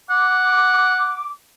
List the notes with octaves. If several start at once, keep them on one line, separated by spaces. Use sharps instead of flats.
F#5 D6